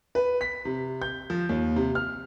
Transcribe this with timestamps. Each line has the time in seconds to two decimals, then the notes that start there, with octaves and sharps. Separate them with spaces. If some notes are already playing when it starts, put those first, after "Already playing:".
0.15 B4
0.41 B6
0.65 C3
1.02 G6
1.30 F3
1.49 D#2
1.76 C3
1.95 F6